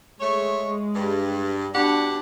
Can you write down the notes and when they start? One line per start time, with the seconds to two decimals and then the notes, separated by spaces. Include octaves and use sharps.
0.20 G#3 A3 C#5
0.95 G2
1.73 B2 D4 G4 F#5